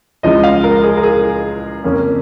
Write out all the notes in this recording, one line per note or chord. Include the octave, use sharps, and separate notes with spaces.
C#2 C#3 F3 G#3 D#5
F5
A#4
G#4
A#4
G#4
F2 C#3 A#3 C#4